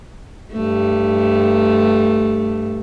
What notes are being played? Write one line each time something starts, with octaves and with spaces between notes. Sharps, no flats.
G2 A3